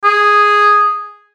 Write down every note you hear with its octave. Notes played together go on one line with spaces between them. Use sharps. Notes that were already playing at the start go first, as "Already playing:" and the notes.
G#4